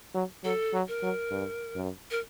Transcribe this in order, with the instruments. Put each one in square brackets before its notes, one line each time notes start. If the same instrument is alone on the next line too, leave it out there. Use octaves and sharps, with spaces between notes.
[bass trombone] F#3
[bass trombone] F#3 [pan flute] A4
[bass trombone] F#3
[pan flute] A#4
[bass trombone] F#3
G2
F#2
[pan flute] A#4